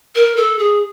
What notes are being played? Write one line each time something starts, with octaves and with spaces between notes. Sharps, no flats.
A#4
A4
G#4